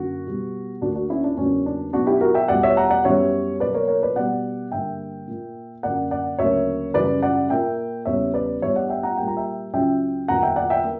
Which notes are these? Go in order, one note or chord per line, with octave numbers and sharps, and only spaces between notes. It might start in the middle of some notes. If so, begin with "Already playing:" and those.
Already playing: F#2 D3 A#3 F#4
B2 G3 B3
D2 D3 A#3 D4 F#4
D4 F#4
C#4 E4
D4
E2 C#3 F#3 A#3 C#4
D4
B2 F#3 B3 D4 F#4
E4 G4
F#4 A#4
E5 G5
E2 B2 G3 B3 D5 F#5
C#5 E5
F#5 A#5
D5 F#5
F#2 E3 G3 B3 C#5 E5
B2 F#3 A#3 B4 D5
A#4 C#5
A#4 C#5
B4 D5
B2 G3 B3 D5 F#5
G2 D3 A#3 E5 G5
A#2 A#3
F#2 D3 A#3 D5 F#5
D5 F#5
D2 C#3 F#3 A#3 C#5 E5
F#2 C#3 E3 G3 B4 D5
D5 F#5
A#2 A#3 E5 G5
E2 C#3 G3 B3 C#5 E5
B4 D5
G2 E3 G3 B3 C#5 E5
D5 F#5
E5 G5
F#5 A#5
A#2 G3 A#3 G5
A#5
E5 G5
C#2 C#3 F#3 E5 G5
E2 D3 F#3 A#3 F#5 A#5
E5 G5
D5 F#5
E5 G5
A#3